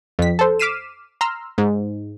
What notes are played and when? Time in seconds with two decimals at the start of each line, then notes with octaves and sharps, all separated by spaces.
0.19 F2 B6
0.39 A4 C5
0.59 D6 F6 B6 C7 D#7 E7
1.21 A#5 C6 E6 F6
1.58 G#2